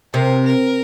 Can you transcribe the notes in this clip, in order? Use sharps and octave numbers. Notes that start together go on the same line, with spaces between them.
C3 A#4
A#4